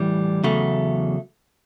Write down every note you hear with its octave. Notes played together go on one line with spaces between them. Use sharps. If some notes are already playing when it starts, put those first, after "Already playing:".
Already playing: A2 E3 G3
E2 C#3 F#3 A3